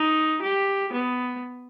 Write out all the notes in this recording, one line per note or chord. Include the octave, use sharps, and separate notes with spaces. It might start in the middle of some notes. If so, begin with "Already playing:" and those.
Already playing: D#4
G4
B3